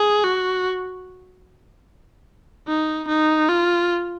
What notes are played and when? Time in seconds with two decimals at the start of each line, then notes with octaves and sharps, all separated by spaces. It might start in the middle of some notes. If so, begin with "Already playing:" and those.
Already playing: G#4
0.24 F#4
2.67 D#4
3.08 D#4
3.49 F4